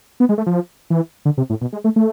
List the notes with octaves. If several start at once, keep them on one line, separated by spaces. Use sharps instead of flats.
B3
G#3
A3
F3
E3
D3
C3
A2
B2
G#3
A3
A3